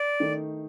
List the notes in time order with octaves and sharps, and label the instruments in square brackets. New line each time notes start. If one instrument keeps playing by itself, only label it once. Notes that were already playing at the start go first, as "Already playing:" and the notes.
Already playing: [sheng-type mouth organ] D5
[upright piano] D#3 A3 D#4